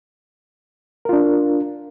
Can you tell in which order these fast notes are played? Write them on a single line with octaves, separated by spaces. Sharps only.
A#4 F4 D4